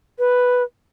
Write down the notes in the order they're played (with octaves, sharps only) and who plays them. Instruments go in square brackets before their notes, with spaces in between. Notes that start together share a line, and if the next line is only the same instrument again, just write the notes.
[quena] B4